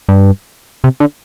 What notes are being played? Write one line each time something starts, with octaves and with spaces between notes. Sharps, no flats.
G2
C3
D3